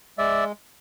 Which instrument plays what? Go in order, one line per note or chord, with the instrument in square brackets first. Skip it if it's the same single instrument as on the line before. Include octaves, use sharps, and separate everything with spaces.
[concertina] G#3 D5 E5